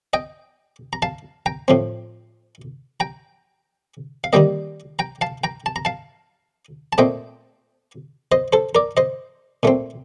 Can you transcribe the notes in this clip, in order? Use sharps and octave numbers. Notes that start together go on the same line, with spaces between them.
D#5 G5
A#5
F5 A5
G5 A#5
A2 F3 C4
G5 A#5
F5
D#3 G3 A#3 D#5 G5
G5 A#5
F5 A5
G5 A#5
A5
A#5
F5 A5
A5
A#2 A3 C4 D#5 G5
C5 D#5
A4 C5
A#4 D5
C5 D#5
A#2 A3 C4